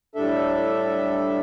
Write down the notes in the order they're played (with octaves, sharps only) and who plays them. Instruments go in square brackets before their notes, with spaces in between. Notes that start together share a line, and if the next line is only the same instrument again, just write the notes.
[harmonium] A2 G3 D4 A4 E5